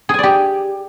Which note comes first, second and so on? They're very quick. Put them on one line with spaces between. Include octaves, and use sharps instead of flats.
G#4 G#5 D5 G4